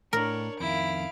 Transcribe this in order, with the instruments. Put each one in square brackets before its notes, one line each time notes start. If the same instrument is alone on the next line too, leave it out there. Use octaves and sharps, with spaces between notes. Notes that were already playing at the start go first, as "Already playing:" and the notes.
[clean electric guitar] A2 [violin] D4 C#5 [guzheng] A#4
[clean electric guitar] F2 D#3 [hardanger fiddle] E4 [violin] F5 D7